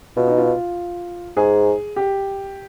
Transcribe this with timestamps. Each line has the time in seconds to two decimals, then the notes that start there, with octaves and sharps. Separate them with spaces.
0.17 B2 F4
0.27 D#4
0.38 F4
1.37 G#2 G#4
1.96 G4